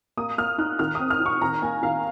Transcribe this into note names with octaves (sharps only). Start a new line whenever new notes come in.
A#3 D#6
A#3 F6
D#4 F#6
D#3 F6
C4 D#6
F6
D#4
C#6
D#3 A#5
A#3 G#5
D#3 F5